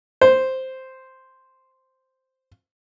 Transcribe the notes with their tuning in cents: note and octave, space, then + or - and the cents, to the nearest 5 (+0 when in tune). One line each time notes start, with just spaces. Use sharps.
C5 +0